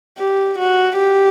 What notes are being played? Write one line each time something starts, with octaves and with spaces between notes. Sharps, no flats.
G4
F#4
G4